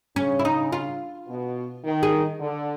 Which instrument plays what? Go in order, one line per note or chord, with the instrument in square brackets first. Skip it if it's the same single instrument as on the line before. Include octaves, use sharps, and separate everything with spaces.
[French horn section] C#3 [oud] C#4
[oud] E4
D#4
F4
[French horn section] B2
D#3
[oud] G#4
[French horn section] D3